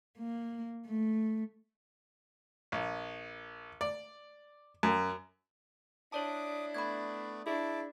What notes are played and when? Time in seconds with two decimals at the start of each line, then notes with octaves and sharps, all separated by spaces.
0.19 A#3
0.87 A3
2.72 A#1
3.81 D5
4.83 F#2
6.12 D4 E4 C#5 D5 A5 D6 D#6
6.74 A3 B3 D5 B5 G#6
7.47 D4 E4 G#4 A5 D6